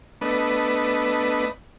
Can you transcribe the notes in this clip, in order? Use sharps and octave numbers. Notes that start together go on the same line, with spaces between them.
A3 B3 D4 B4 D#5